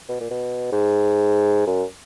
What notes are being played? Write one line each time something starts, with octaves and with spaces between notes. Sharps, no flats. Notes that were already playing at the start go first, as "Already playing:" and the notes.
B2
A#2
B2
G#2
F#2